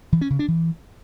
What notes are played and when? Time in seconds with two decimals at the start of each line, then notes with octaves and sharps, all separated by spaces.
0.12 E3
0.21 C#4
0.30 C#3
0.39 D4
0.48 E3